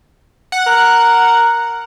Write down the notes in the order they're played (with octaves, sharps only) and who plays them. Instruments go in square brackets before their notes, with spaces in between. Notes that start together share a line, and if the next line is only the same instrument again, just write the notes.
[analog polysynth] F#5
[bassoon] A#4